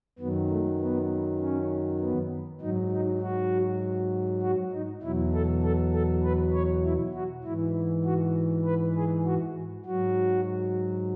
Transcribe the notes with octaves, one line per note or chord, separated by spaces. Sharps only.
F#2 D#3 F#3 B3
A3
B3
C#4
B3
G#2 F#3 D#4
D#4
F#4
F#4
D#4
E2 B2 F#3 E4
A4
A4
A4
B4
C#5
E4
F#4
G#2 E3 E4
F#4
B4
G#4
F#4
G#2 F#3 F#4